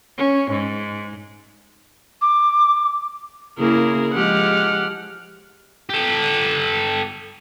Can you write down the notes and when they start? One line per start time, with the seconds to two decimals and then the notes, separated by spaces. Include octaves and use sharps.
0.18 C#4
0.51 G#2
2.21 D6
3.58 C#3 A#3 E4 G#4 A#4
4.14 F3 G#3 G4 F#5 F6
5.89 G4 A4